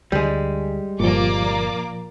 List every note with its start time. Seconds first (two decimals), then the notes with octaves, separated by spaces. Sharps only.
0.12 D2 G3 G#3
1.00 G1 A#2 F3 A#3 D5 D6